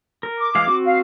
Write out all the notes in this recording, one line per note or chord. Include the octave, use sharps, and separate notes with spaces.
A#4
D6
E3 G#3 F5
C4 F#4
F5